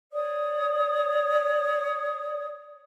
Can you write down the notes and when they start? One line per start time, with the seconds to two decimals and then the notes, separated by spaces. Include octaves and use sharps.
0.13 C#5 D5 D#6